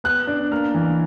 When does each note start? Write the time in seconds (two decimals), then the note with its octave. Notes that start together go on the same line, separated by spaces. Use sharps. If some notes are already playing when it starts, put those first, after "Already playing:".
0.04 B3 F#6
0.27 D4
0.51 A#3 F6
0.74 E3